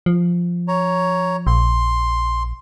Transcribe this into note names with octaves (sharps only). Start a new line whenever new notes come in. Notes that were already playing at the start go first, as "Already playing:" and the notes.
F3
C#5 A#5
A#1 C6